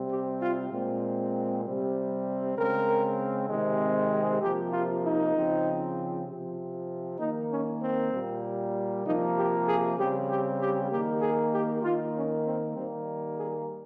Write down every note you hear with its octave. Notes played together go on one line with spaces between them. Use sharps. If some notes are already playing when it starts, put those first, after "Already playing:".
Already playing: C3 G3 C4
G4
F4
A#2 G#3 C4
C3 G3 C4
C#3 G#3 C4 A#4
C3 D#3 G#3 C4
C3 F3 A#3 G4
F4
D#4
C#3 F3 C4
C3 F3 C4
D#3 A#3 D#4
C#4
C4
A#2 G3 A#3
C3 F3 A#3 D#4
G4
G#4
C#3 G3 C4 G4
G4
G4
D#3 A#3 G4
G#4
G4
D#3 A#3 F4
C#4
C4
D#3 G3 A#3 C4
G#4